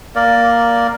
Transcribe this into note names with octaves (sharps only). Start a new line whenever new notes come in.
A#3 A#4 D5